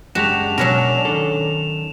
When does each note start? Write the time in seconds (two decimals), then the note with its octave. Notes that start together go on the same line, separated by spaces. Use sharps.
0.15 F#2 C#3 G#3 D4 F#4 G4 E7 F7
0.58 B2 F#3 C#4 A#4 E7
1.05 D#3 A4